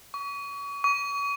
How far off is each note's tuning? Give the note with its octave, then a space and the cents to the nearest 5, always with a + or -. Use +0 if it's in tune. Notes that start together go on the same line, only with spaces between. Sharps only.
C#6 +35
C#6 +40